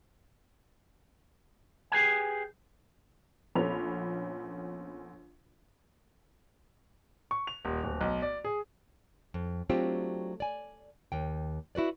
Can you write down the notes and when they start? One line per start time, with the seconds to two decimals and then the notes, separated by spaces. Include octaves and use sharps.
1.92 G4 G#4 B4 G#5
3.55 A#1 B3 C#4 A4 B5 F7
7.31 C#6
7.47 F7
7.65 D#1
7.84 D1
8.01 B1
8.22 D5
8.45 G#4
9.34 F2
9.69 F#3 A3 C4 D4 F4 G4
10.40 D5 G#5
11.12 D#2 G5
11.75 E4 F#4 B4 D5